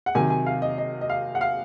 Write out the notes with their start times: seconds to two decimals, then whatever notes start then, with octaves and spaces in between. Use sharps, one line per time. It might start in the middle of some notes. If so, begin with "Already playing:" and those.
0.06 F#5
0.15 C3 D#3 F#3 G#5
0.30 G#5
0.46 F5
0.62 D#5
0.78 D#5
1.01 D#5
1.10 F5
1.35 F#5
1.41 F5